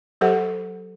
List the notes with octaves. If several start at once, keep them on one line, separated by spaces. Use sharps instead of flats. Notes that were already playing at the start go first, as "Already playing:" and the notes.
F#3 G4 A4 C5 F#5